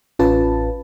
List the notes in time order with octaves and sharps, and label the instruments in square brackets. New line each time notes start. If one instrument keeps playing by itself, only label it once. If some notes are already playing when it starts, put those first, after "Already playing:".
[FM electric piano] A1 C#4 F4 B4 A5